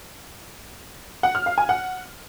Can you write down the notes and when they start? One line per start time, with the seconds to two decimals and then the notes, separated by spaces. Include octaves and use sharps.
1.23 F#5
1.35 F6
1.46 F5
1.58 G#5
1.69 F#5